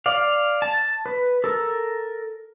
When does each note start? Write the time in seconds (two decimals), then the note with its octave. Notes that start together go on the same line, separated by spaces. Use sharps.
0.06 D5 F5
0.62 A5
1.06 B4
1.44 A4 A#4